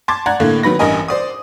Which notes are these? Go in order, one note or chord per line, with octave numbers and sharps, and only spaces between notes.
A5 C6 D6 G#6 A6
D5 F#5 A#5 F#6 G#6
A2 D3 A#3
D#3 F#3 B3 B5 A#6
A1 G2 A#4 D#5 G#5
C5 D5 D#6